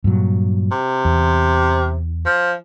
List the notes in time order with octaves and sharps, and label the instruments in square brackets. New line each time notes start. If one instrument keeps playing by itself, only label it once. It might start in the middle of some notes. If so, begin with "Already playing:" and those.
[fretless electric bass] G2 A#2 F#3
[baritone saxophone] C3
[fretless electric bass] E2
[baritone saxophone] F3